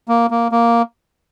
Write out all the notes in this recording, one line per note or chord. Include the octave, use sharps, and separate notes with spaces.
A#3
A#3
A#3